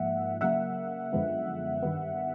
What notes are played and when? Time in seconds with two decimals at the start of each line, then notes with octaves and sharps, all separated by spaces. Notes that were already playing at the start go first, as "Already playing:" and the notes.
Already playing: G#2 F3 A#3 E5 F#5
0.41 C#3 F#3 A#3 E5 F#5
1.13 F#2 D3 F3 G#3 B3
1.83 G2 D#3 G3 B3